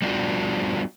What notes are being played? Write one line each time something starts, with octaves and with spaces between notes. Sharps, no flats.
G3 B3 D4 F4 F#4